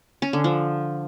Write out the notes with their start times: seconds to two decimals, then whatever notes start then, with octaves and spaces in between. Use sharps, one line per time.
0.22 C#4
0.33 D3
0.44 F3